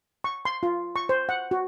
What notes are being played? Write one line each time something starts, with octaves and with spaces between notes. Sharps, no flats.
C#6
C6
F4
C#6
C5
F#5
F#4